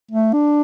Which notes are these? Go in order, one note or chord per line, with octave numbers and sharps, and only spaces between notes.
A3
D4